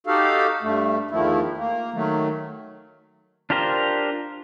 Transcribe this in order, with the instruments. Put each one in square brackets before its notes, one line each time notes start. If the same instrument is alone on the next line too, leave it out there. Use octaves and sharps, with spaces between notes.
[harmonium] D#4 F#4 G4 A4 F5
G2 A3
E2 D#3 F3 A3 E4
A#3
D#3 F#3 A3
[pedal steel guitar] D4 F4 G4 A#4 C5